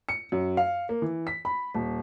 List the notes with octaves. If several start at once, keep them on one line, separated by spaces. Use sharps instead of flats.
C#7
F#2
F5
A#3
E3
B6
B5
D#1